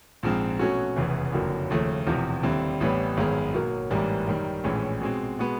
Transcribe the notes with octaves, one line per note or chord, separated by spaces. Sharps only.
A#1 G#2 F3 G#3 C4
B2 F#3 A3 C#4 F#4
F1 E2 C#3 E3
F#1 F2 D3 F#3 A#3
D#2 C#3 F3 A3
E1 E2 C3 F3
D#2 D3 G3 C4 E4
A1 A2 E3 G3 B3
G#1 F#2 D#3 G#3 B3
B2 F#3 A#3
A1 G#2 E3 G3 A#3
F#2 D#3 G3
A#1 A2 E3 G#3 C#4
B2 G#3 C4
B2 G#3 B3